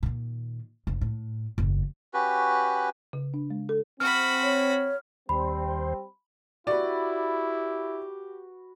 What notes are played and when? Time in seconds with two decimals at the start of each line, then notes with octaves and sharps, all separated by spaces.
0.03 A#2 D#3
0.87 F1
1.01 A2
1.58 F#1 E2
2.14 C#4 F#4 G4 B4
3.13 C#3
3.34 D4
3.50 G#3
3.69 A4
4.00 C4 F#4 B5 F6
4.43 C#5
5.29 D#2 G3 C4 C5 B5
6.67 E4 F#4 G4 B4 D5